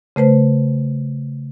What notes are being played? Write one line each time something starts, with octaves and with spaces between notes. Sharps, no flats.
C#3 A3 B4 C5